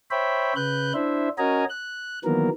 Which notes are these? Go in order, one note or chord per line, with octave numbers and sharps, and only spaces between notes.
C5 C#5 E5 G5 B5
C#3 B4 F#6 G6
D4 E4 C5 E5
C#4 F#4 A#4 D#5 G#5 A#5
F#6
D#3 E3 F#3 A#3 B3 A#4